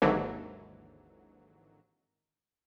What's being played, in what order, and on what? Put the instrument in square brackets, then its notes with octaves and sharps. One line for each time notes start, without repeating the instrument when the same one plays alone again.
[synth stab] G#1 D#2 G#2 D3 E3 F#3